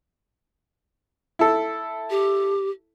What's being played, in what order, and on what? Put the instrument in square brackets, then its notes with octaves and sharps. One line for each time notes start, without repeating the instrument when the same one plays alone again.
[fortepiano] E4 A4
[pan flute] G4